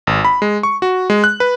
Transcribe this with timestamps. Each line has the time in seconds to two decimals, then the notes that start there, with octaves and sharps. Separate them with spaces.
0.07 G#1
0.25 B5
0.42 G#3
0.63 C#6
0.82 F#4
1.10 G#3
1.24 F#6
1.40 B4